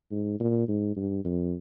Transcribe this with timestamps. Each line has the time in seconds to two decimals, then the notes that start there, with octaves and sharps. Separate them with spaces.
0.12 G#2
0.40 A#2
0.68 G#2
0.96 G2
1.25 F2